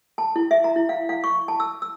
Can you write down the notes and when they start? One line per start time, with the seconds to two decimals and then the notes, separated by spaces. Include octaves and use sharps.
0.18 A5
0.36 E4
0.51 E5
0.64 A#5
0.76 E4
0.89 F5
1.09 F5
1.24 C#6
1.48 A5
1.60 E6
1.82 E6